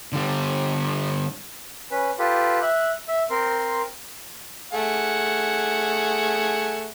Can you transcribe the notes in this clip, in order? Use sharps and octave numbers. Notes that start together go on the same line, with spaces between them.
D3 G3
C#4 B4
F4 G4 A4 B4
E5 F#6
E5
C4 A#4 C6
A3 G#4 F#5